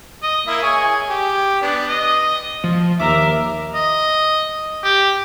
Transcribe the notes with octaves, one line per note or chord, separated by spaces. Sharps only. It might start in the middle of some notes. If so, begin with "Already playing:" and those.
D#5
A#3 E4 E5
G#4 C#5 G#5
G4
B3 D4
D#5
F3
D#2 A#4 E5 D6
D#5
G4